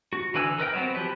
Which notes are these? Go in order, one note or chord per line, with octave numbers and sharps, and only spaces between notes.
F#4
D3 E3 B4 G#5 E6
A#4 B4 D#5 G5
F#3 B3 C4
F3 G4 B4